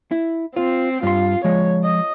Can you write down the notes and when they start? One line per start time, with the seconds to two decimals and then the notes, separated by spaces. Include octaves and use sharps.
0.11 E4
0.56 C4 F4
1.03 G2 F4 C6
1.44 F3 G#3 C#5
1.84 D#5